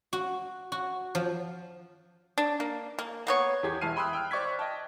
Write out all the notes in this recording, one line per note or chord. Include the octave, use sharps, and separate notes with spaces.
F#4
F#4
F3
D4
A#3
A#3
A#3 B3 C#5
E2 G4 G#4 G#6
E1 E4 A5 F6 C7 D#7
G5 B5 C6 D#6 E6 F#6
G5 E6 F6
C5 D5 C#6 F#6 G#6 B6
D#5 G5 A5